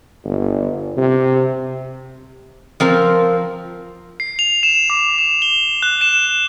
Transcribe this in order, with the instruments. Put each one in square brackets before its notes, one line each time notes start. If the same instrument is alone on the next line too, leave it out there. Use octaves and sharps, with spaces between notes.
[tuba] G1
C3
[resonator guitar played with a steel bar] F3 C4 A#4
[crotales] C7
F7
E7
D6
E7
G7
F#6
E7